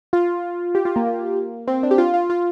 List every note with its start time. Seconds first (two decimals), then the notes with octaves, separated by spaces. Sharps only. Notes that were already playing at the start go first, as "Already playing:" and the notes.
0.13 F4
0.75 G4
0.85 F4
0.96 A#3
1.06 A#3
1.67 C4
1.83 D4
1.91 G4
1.98 F4
2.14 F4
2.30 F4